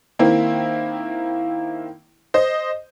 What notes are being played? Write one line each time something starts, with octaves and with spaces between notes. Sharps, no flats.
D#3 A#3 C4 E4
C5 D#5